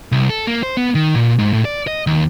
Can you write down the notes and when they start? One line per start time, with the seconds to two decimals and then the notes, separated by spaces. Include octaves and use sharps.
0.12 C2
0.29 A4
0.47 A#3
0.63 C5
0.77 B3
0.95 D#3
1.15 A#2
1.39 G#2
1.53 A2
1.65 D5
1.87 D#5
2.07 D#2